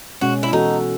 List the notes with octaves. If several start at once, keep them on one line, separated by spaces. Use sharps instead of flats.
B2 G#3 C#4 F#4
E4
E3 B3 D#4 F#4 A4